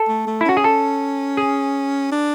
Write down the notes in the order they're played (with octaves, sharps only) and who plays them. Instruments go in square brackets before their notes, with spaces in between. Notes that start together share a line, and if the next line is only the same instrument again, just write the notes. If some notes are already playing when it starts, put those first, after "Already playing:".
Already playing: [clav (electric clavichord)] A4
[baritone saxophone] A3
A3
[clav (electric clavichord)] E4
[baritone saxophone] C#4 [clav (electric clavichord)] F#4
[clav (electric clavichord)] G#4
A4
G#4
[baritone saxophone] D4